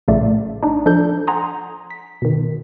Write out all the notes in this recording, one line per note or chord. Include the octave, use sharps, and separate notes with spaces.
A#1 A2 C#3 A3 D5 E5
D4 D#4
F3 D4 A4 G6
F#5 G#5 A#5 C6 D#6
B6
B2 D#3